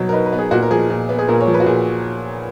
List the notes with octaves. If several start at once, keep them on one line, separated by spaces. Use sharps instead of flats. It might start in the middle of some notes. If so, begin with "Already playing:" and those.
Already playing: B2 F#3 B3 D#4
A#4
D#4 B4
B4
B3
G#4
A#2 F#4
A#4
F3 G#4
A#2
B3
G#4
A#2 A#4
C#5
F3
B4
F#4
A#2 G#4